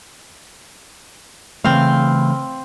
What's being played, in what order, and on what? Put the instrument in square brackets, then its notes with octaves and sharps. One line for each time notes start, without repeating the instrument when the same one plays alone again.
[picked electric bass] C#3 E3 A3 [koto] C4 F5